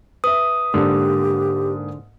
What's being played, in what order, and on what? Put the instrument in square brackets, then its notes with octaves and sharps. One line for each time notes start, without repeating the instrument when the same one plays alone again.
[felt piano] B4 E5 [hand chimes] D#6
[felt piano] G#2 A#3 D4 [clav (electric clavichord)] D3 [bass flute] G4